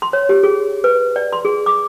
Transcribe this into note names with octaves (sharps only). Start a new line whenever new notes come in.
C6
C#5
G4
G#4
B4
D5
C6
G#4
D6